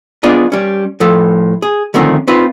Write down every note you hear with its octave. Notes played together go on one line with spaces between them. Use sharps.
B3 D4 F4 G#4 D5 D#5
G3 C#4
A2 F3 A4
G#4
D3 D#3 F3 A3 C4 C#4
C4 D#4 F4 B4